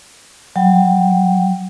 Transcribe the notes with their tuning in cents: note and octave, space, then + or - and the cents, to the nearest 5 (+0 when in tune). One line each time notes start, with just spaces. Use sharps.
F#3 +0 G5 +0